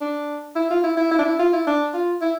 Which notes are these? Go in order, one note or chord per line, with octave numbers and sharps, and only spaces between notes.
D4
E4
F4
E4
E4
E4
D4
E4
F4
E4
D4
F4
E4